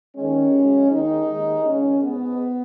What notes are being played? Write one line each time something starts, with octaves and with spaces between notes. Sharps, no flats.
D#2 D#3 G#3 C#4
F#2 C#3 G#3
D#2 D#3 G#3 D#4
D#2 D#3 G#3
D#2 C#3 G#3 C#4
G#2 G#3 B3